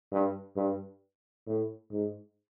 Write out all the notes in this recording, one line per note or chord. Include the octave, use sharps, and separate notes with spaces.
G2
G2
A2
G#2